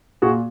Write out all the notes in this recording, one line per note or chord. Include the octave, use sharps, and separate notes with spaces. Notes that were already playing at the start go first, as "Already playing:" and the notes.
A#2 F#4 G#4